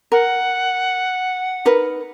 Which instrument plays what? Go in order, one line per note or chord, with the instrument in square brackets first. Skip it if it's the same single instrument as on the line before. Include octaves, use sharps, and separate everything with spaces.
[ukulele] A#4 [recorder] F#5
[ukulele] D#4 A#4 B4